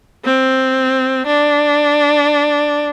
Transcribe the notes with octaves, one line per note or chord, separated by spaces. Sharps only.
C4
D4